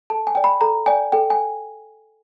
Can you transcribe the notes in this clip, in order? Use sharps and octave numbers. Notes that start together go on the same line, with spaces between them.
A4 A5
G#5
D5 G5
B5
A4 A#5
D5 G5 G#5
A4 G5
G#5